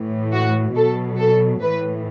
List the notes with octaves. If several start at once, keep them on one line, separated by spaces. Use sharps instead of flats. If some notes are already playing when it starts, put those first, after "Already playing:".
Already playing: A2 E3
F#4
B2 F#3 A4
A4
A2 E3 B4